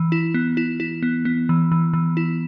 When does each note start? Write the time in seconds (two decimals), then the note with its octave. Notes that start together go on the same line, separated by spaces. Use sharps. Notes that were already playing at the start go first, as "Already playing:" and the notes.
Already playing: E3
0.12 E4
0.34 B3
0.57 E4
0.80 E4
1.03 B3
1.25 B3
1.49 E3
1.72 E3
1.93 E3
2.17 E4